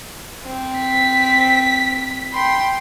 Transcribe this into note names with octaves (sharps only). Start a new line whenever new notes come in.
C4
B6
G5 B5 C6